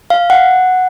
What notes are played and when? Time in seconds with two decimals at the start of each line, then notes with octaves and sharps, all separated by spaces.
0.10 F5
0.30 F#5